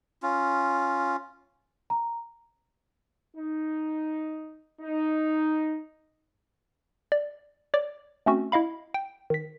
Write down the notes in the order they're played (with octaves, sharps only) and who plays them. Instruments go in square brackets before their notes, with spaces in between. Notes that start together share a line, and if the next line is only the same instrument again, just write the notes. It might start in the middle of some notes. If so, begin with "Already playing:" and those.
[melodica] C#4 F4
[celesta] A#5
[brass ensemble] D#4
D#4
[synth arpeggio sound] D5
C#5 D5 D6
A3 C4 C#4 F#4
E4 D#5 F5 B5
G5
D#3 B6